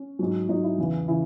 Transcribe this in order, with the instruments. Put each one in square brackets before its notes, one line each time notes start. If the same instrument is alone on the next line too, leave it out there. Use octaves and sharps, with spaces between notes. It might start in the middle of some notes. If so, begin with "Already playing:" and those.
Already playing: [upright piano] C#4
G#2 F#3
G#2 F#3 D#4
E4
E2 C#3 E3
C#3 E3 E4